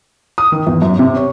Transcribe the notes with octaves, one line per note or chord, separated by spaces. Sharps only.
D#6
D#3
E2
F#2
C3
C#5